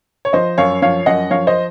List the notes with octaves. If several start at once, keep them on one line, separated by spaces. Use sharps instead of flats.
C#5
F3 C5 D#5
F#2 C#5 F5
F3 C#5 F5
F#2 D#5 F#5
F3 C#5 F5
C5 D#5